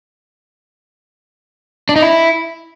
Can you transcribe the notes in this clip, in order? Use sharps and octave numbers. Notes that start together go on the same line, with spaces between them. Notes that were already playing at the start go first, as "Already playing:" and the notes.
D4
D#4
E4